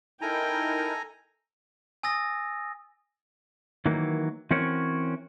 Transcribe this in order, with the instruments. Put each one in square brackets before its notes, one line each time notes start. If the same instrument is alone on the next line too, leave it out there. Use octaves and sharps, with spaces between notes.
[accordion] D#4 E4 A#4 [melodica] A4 [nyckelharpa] G5 [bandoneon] G#5 A#5
[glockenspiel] G#5 D#6 E6 A6 A#6
[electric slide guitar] D#3 E3 F#3 A#3
E3 C4 C#4 F#4 A#4 C#5